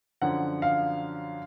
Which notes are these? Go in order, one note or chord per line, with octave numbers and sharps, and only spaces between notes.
F#2 D3 F3 F#5
F5